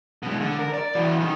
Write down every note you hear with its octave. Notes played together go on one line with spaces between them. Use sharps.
B2 G#3
D3
A#4
D5
E3 F#4
B1 D#3